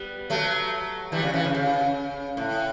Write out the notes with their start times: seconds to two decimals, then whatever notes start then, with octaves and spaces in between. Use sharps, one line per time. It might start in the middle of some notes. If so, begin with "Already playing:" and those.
Already playing: G3 B3
0.30 F#3 A3
1.12 E3 G3
1.22 C#3
1.34 C#3 E3
1.44 C#3
1.55 C#3
2.37 A2